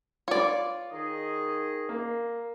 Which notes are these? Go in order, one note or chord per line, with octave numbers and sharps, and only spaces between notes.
F4 C#5 D5
D#3 G#4 D#5
A#3